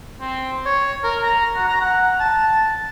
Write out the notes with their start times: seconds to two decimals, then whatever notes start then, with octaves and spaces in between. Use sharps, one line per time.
0.20 C4
0.65 C#5
1.03 A#4
1.22 A#5
1.56 F#4
1.68 A#5
1.81 F#5
2.20 A5